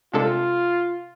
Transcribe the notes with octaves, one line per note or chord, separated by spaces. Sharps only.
C3 G#3 D4 F4 A4